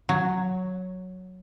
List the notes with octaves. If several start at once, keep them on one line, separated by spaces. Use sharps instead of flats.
F#3